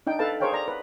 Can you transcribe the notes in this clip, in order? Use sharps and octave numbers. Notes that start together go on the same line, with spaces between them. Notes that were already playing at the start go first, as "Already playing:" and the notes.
D4 D#4 G5
A4 B4 F5 A5
G#4 A#4 C5 C#5 F5 G5
D5 A#5
B4